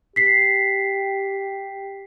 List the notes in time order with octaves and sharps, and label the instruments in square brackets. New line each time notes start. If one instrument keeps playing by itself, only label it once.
[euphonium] G4 [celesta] B6 C7